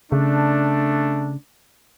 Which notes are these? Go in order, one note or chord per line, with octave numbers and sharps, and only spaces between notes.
C#3 A3 D4